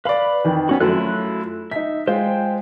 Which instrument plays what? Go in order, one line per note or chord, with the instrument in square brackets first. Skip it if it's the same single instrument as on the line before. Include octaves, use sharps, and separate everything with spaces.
[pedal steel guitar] B4 B5 [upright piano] D5 F5
[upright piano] F2 D#3 E3
[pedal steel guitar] B3 C#4 F#4
[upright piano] F#2 F#3 A3 [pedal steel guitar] E4 F4 F#6
[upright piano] D#4 B6 [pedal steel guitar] E5
[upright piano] G#3 F4 [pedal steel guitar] C5 G5